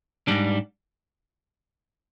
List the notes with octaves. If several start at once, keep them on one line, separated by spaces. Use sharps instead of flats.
G#2 G3 D4